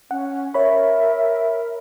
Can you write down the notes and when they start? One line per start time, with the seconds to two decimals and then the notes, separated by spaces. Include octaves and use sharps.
0.11 C#4 F#5
0.54 A#4 C#5 E5 B5